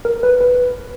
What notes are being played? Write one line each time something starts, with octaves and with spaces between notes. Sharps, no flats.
A#4
B4
B4